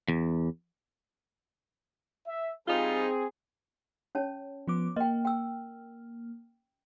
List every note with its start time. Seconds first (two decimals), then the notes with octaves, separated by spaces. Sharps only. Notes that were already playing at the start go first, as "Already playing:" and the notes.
0.08 E2
2.27 E5
2.68 G3 C4 D#4 F4 G#4
4.15 C#4 C#5 A5
4.68 F3 B3 D6
4.96 A#3 D#5 G5
5.25 G5 E6